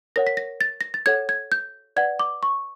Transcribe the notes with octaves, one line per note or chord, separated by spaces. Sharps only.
A#4 C#5 F#5 A#6
B6
A#6
A6
A#6
A6
A4 C#5 F#5 G#6
G#6
G6
B4 D5 F#5 G#6
D6
C#6